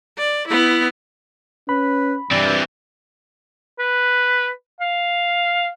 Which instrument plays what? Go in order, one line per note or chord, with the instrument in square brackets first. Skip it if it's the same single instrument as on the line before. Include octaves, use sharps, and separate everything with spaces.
[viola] D5
B3 E4
[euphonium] C#4 [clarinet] B4 [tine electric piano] B5
[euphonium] G2 [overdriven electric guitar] E3 C4 [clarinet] D5
[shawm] B4
F5